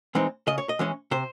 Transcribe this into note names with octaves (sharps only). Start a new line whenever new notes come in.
E3 G#3 C4 D#4
C#3 D#5
C#5
D#5
E3 G#3 C#4
C3 C5